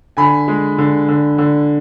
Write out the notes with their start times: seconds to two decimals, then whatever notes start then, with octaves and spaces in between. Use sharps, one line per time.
0.17 D3 G#5 B5
0.48 G#3
0.78 D3
1.08 D3
1.38 D3